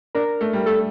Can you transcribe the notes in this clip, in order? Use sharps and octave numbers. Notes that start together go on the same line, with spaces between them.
D4 A#4
A3
G3
A3 A4